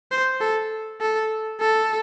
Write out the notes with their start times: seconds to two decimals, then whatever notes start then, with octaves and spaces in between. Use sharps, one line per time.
0.11 C5
0.41 A4
1.01 A4
1.60 A4